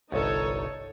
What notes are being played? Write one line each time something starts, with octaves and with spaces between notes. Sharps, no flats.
G1 C2 D#4 A4 C#5